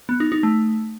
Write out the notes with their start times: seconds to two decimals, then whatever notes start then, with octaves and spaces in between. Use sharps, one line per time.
0.09 B3
0.20 D#4
0.32 D#4
0.43 A3